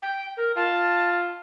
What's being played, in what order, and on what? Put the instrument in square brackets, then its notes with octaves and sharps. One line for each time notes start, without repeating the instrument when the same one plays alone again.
[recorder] G5
A#4
[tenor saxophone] F4 [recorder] A5